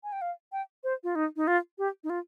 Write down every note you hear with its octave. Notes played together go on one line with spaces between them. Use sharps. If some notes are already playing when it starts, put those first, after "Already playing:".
G#5
G5
F5
G5
C5
F4
D#4
D#4
F4
G4
D#4
F4